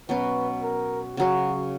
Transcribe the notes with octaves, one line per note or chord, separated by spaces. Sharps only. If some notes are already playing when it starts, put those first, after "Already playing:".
B2 F#3 C#4 B4
A#4
C#3 F#3 C#4 F#4